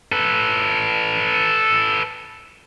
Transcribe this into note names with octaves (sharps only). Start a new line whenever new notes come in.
A4 B4